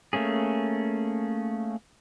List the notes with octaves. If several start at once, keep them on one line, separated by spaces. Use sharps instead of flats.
A3 A#3 C#4 G#4